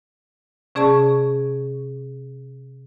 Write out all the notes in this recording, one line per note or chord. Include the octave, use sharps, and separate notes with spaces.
C3 C#4 G#4 D5 A5 C#6